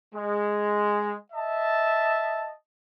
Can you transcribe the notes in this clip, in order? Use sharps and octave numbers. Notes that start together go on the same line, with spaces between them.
G#3
D#5 E5 A5